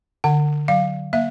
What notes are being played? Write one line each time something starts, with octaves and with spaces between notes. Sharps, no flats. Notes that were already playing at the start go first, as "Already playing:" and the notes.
D3 F#5
F#3 F5
A#3 E5